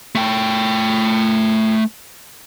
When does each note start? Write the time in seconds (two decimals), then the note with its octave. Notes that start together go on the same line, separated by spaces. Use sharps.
0.15 A3 G5